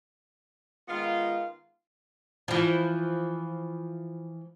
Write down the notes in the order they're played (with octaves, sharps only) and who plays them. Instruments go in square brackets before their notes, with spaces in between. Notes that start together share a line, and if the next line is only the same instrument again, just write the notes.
[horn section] D#3 G#3 B3 F4
[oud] E3 F3